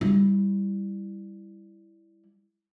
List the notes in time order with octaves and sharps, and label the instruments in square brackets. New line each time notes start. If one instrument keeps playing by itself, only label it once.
[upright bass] G3 E4